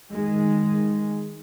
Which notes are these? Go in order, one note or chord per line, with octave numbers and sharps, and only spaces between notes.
D#3 G#3